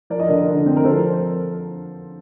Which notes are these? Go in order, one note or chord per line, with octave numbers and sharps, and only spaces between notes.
F3 A#4 D5
D#5
D3 A#4 D5
D3
C4
A#4
F3 A4 C5